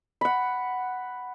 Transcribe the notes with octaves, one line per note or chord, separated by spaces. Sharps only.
F#5 B5